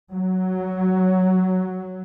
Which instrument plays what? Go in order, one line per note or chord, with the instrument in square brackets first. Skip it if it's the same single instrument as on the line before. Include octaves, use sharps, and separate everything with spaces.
[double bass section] F#3